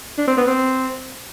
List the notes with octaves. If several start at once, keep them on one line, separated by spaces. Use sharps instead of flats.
D4
C4
B3
C4